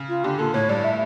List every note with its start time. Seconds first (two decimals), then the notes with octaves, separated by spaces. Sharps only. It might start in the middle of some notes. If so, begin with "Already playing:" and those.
Already playing: C#3
0.09 F4
0.24 D3 G4
0.39 A#2 A4
0.54 A2 C#5
0.69 G2 D5
0.84 E5